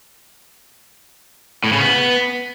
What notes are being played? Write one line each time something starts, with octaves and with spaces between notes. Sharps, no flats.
A2
C#3
B3